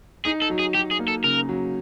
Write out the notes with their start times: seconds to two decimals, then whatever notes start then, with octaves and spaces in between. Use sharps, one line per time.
0.25 D#4 G#4
0.42 A4
0.50 F#3
0.59 G#4
0.75 F#3 G4
0.91 G#4
0.99 A#3
1.08 A4
1.24 C#3 A#4
1.49 F#3